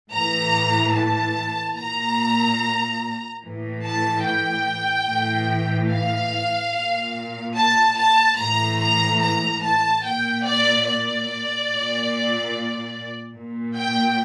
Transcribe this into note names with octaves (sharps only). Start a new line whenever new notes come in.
A2 E3 A#5
A5
A#2 A#5
A2 E3
A5
G5
A2 E3
F5
A#2
A5
A5
A2 E3 A#5
A#5
A#5
A5
A#2 G5
D5
D5
A#2
A#2
G5